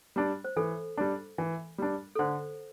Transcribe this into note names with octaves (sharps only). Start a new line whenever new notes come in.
G3 D4
C5
E3 A4
G3 D4
E3
G3 D4
A4
D3 C5